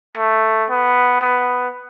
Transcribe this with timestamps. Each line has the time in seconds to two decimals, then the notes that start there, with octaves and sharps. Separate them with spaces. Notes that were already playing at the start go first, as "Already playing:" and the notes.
0.17 A3
0.69 B3
1.21 B3